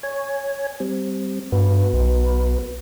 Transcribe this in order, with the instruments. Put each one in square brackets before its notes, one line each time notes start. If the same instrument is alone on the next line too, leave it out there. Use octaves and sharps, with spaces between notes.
[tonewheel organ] C#5 G#5
G3 C4
[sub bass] G2 [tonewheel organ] B3 F#4 B4
[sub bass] B1